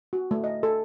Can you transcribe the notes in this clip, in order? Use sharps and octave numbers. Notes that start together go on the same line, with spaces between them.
F#4
A3
D#5
A4